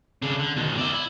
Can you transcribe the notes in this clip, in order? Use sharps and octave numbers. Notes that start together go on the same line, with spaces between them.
C#3 D4
D3
B2 D#3
D5 E5
E4